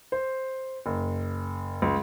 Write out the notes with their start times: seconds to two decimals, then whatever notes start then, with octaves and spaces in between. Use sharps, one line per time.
0.12 C5
0.86 F#1
1.82 C#2